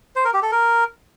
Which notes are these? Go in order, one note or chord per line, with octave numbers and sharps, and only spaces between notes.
C5
A#4
G4
A4
A#4